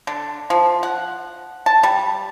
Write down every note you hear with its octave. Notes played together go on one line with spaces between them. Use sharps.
D3
F3
F#5
A5
G3